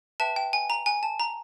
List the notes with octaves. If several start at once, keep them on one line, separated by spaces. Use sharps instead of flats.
B4 E5 G5 A5
G5
G#5
A#5
G#5
A5
A#5